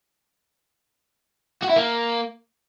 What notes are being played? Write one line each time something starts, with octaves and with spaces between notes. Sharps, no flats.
F#4
E4
A#3